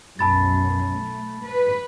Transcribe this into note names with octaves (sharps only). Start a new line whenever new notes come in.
B1 F#2 A5 B5 A6
A3
B4